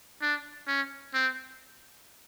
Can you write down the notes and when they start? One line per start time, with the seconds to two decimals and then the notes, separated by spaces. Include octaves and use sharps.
0.21 D4
0.67 C#4
1.14 C4